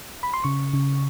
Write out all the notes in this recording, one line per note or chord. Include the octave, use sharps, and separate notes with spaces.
B5
C6
C#3 C#6
C#3